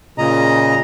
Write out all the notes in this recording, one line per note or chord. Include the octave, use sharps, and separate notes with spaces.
A#2 C#3 D#5 A#5